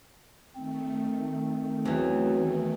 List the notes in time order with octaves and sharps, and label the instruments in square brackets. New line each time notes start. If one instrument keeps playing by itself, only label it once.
[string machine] D#3 A3 [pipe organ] C4
[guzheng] E2 E3 [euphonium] F#3